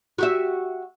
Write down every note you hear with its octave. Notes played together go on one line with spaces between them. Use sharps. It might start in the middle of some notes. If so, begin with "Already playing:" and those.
F#4 G4 E5